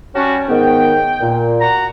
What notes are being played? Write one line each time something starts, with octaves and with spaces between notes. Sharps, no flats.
G3 C#4 F#4 A5
G#2 D#3 B3 G5
A#2
F#4 A#5